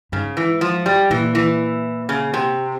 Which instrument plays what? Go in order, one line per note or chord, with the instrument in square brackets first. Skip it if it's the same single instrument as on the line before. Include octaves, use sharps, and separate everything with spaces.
[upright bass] G#2 [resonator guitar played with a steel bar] C#3
[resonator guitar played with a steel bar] E3
F3
G3
[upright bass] A#2 [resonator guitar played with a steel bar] E3
[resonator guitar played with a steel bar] E3
C#3
C3